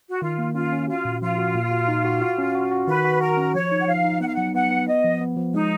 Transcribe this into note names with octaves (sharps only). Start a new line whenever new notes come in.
F#4
D#3 F4
A#3
C#4 F4
C#4
F4 F#4
A#2
F3 F4
F#4
A#2
F#4
D#4
F#4
F#4
C#4
F#4
F#4
D#3 B4
F#4
F#4 A#4
C#4
F3 C#5
D#4
F#5
F3 F5
D#4
B3 F#5
F5
F#3 F#5
B3 F#5
B3
B3 D#5
F3
B3
F3
G#3 D#4